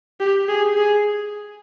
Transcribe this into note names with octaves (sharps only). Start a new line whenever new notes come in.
G4
G#4
G#4